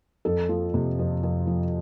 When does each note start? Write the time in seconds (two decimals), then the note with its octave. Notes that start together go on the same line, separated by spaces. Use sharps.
0.25 F2 A4
0.49 F3
0.74 C3
0.99 F2
1.23 F2
1.47 F3